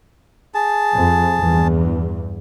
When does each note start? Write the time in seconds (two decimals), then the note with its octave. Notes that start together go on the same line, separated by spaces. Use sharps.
0.54 G#4 A5
0.94 F2
1.38 E2 G2